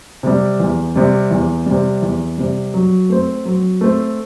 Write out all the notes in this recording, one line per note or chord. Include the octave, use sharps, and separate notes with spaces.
C3 G3
E2
C3 G3
E2
C3 G3
E2
C3 G3
F#3
A3 C4
F#3
A3 C4